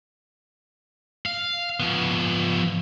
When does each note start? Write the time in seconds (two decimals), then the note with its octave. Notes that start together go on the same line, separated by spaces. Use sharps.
1.26 F5
1.80 F3 B3